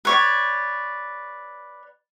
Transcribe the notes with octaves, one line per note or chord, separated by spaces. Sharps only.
B4 C#5 D5